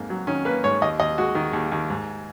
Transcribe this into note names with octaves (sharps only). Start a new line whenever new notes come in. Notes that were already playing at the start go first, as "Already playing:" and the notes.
Already playing: F2 G#2 A#3
F#3
D#3 C#4
A#3 B4
G#2 C#5
D#2 D#5
D#2 D#5
G#3 F#4
D#3
D#2
D#2
G#2